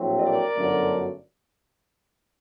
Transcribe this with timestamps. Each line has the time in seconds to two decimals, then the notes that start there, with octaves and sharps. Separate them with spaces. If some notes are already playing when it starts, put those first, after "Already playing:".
Already playing: A#1 A2 F#3 A3 C4
0.21 A#4 D5
0.55 G1 F#2 D3 F#3 A3